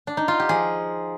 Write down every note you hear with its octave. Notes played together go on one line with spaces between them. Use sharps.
D4
D#4
F4
G4
F3 G#4